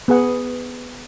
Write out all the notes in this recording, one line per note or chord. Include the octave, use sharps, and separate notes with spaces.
B3 G#4 F#5